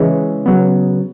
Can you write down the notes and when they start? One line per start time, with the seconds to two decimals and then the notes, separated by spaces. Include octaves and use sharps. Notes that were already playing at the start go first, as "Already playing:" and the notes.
Already playing: C#3 E3 G#3 C#4
0.46 C#3 F#3 B3